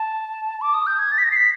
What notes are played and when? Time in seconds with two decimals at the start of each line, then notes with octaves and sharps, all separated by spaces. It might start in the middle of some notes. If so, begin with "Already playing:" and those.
Already playing: A5
0.61 D6
0.74 D#6
0.87 G6
0.99 G#6
1.12 A6
1.18 B6
1.24 A#6
1.32 C7
1.37 B6